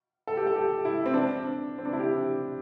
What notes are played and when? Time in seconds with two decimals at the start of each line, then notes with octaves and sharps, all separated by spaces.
0.27 A4
0.37 G4
0.47 A4
0.56 G4
0.85 E4
1.06 C4
1.14 D4
1.78 C4
1.85 D4
1.93 E4
1.99 G4